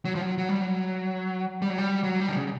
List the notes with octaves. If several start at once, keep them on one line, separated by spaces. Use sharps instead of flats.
F#3
F3
F#3
F#3
G3
F#3
G3
F#3
G3
F#3
G3
D3
C#3